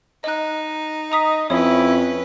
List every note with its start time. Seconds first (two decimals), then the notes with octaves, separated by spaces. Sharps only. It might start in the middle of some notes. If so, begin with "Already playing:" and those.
0.24 D#4 D#5 F#6
1.12 D#5 A#5 D#6 B6
1.50 F2 C#4 E4 B4 C#5